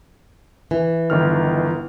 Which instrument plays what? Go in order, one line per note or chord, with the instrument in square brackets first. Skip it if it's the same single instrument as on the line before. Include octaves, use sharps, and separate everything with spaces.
[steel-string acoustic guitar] E3
[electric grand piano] G1 D#3 F6